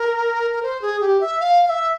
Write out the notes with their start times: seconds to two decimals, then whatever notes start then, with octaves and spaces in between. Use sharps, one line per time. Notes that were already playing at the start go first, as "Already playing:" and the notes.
Already playing: A#4
0.52 A#4
0.63 C5
0.82 G#4
1.01 G4
1.21 E5
1.40 F5
1.65 F5
1.69 E5